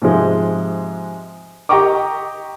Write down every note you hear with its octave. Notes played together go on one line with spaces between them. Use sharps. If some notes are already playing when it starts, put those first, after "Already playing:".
G#2 C3 F3 G#3
G4 D#5 G5 A#5 C#6 D6